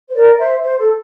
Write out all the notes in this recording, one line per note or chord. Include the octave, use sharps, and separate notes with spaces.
C5
A#4 D5
C5 E5
C5
A4